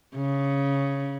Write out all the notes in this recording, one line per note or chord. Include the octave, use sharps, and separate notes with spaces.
C#3